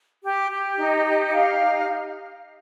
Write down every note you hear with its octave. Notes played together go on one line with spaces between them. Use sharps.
G4
G4
D#4
G4
F5
D#4